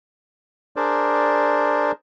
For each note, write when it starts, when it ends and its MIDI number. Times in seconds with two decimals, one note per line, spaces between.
0.76 1.92 62
0.76 1.92 68
0.76 1.92 70
0.76 1.92 72
0.76 1.92 74